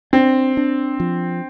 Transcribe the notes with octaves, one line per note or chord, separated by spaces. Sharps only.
C4 D4
D4
F3